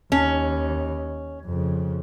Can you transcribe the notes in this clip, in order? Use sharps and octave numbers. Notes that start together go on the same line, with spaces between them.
D#2 C#4
F2 C#3